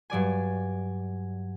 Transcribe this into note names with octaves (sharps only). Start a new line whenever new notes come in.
G2 F#3 D5 G#5